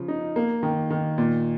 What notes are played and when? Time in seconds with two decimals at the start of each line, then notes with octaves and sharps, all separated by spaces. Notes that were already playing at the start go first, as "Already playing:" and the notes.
Already playing: C#3 F3
0.08 D#4
0.36 A#3
0.63 D#3
0.90 D#3
1.18 A#2